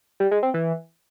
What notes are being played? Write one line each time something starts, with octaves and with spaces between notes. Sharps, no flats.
G3
G#3
C4
E3